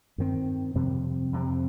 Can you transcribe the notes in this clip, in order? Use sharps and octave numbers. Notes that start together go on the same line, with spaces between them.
G2 D#3 C4
F2 C3 G3 C4
F2 C3 G3 C4